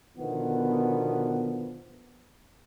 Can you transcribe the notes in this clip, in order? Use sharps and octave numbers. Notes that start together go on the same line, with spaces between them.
B2 D3 D#3 F3 B3